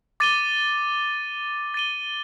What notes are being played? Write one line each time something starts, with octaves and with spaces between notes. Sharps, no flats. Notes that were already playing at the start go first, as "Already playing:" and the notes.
D6 A6 D#7 G7
A6 D#7 G7